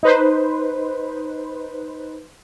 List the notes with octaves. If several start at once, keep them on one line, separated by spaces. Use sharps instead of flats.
D#4 B4 C5